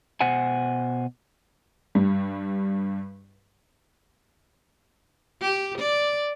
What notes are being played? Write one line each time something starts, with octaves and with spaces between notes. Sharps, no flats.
B2 C5 F#5 G#5
G2 G3
G4
D5